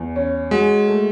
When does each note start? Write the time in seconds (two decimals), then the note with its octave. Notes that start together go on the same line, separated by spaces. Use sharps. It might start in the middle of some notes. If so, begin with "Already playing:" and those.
Already playing: E2
0.16 C#4
0.51 G#3 F#4
0.88 A3